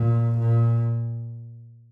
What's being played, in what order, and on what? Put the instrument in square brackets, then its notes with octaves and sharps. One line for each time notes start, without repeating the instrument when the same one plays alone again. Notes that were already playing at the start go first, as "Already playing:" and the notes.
Already playing: [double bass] A#2
A#2